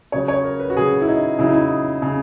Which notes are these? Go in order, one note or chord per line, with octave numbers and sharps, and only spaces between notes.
C#3 F#3 C#5
C#5
A#4
B4
F#4
C#3 F#3 G#4
E4
D#4
C#3 F#3 E4
D#4
E4
C#3